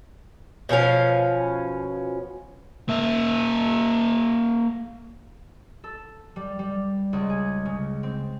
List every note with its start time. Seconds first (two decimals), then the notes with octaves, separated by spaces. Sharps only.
0.69 B2 F3 C#4 F5
2.89 A#3 E5
5.84 A4
6.36 G3
6.59 G3
7.13 C#2
7.29 G#4
7.65 C#3
8.03 C4